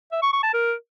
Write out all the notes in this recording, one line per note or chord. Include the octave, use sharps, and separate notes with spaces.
E5
C#6
C#6
A5
A#4